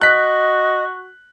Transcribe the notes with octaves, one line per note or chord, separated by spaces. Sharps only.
F#4 D#5 F#6 B6